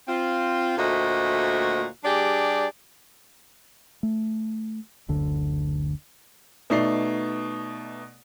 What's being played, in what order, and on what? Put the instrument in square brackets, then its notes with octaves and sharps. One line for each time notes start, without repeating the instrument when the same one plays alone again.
[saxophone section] C4 F4
D2 A#2 A3 F#4 C5 D#5
G3 D4 G4 G#4 D5
[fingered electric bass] A3
F#1 D2 D3
[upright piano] B2 A3 D#4 D5 C7